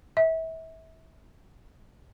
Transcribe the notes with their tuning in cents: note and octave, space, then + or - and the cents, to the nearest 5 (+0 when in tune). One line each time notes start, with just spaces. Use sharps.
E5 -30